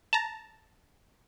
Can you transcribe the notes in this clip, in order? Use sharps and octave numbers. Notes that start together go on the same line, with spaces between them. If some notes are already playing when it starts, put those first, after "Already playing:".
A5 A#5